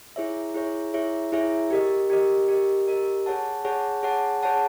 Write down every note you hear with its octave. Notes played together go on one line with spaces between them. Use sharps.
E4 G#4 C#5 E5
E4 G#4 C#5 E5
E4 G#4 C#5 E5
E4 G#4 C#5 E5
G4 A#4 D#5
G4 A#4 D#5
G4 A#4 D#5
G4 A#4 D#5
G#4 C#5 F#5 A5
G#4 C#5 F#5 A5
G#4 C#5 F#5 A5
G#4 C#5 F#5 A5